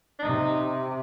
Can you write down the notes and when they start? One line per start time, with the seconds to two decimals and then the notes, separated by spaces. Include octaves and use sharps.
0.19 D4
0.23 C3 D#4